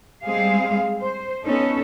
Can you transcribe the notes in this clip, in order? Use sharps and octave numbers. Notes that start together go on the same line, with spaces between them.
G3 G#3 C4 G#4 F5
C5
B3 C#4 D#4 A4